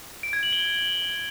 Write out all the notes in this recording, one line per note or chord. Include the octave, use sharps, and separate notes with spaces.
D7
G#6
F#7
G7